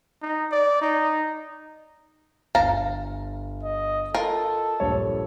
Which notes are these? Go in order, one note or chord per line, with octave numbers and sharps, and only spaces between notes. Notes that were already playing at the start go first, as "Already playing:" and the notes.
D#4
D5
D#4
G1 A4 F5 A#5
D#5
F4 A4 A#4 D#5
A#1 G2 C#5